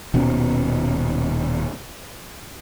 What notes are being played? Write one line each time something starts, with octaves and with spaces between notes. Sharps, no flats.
D#1 B2 B3 C#4